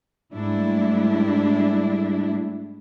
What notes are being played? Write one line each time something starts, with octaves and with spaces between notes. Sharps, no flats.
G#2 G3 A3 D4 E4